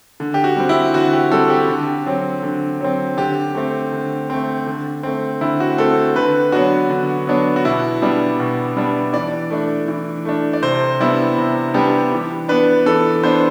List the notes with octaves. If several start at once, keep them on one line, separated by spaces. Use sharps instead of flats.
D3
G4
F#4
G3 C4
E4
D3 F#4
G4
G3 C4 A4
G4
D3
F#3 C4
D3
F#3 C4
D3 G4
A3 C4
D3
A3 C4
D3
A3 C4
D3 E4
F#4
A3 C4 A4
D3 B4
F#3 B3 D4 F#4
D3
F#3 B3 D4
F#4
B2 E4
G3 B3 D4
B2
G3 B3 D4
E3 D5
A3 D4
E3
A3 D4
D5
C3 C5
G3 B3 D4 E4
C3
G3 B3 D4 G4
E3
B3 D4 B4
E3 A4
B3 D4 C5